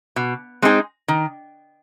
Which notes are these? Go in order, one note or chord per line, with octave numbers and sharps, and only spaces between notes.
B2
G#3 C4 D#4 G#4
D#3